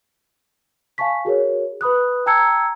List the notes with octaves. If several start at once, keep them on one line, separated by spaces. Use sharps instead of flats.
F5 G#5 A5 C#6 B6
F#4 G#4 A#4 C#5
B4 B5 D#6 F#6
G5 A5 A#5 E6 G#6 C#7